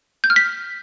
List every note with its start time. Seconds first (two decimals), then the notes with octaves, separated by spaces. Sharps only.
0.24 G6
0.30 F6
0.36 B6